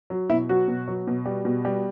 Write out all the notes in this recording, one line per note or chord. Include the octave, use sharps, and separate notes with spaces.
F#3
B2 E4
F#3 F#4
B2
F#3
B2
G3
B2
G3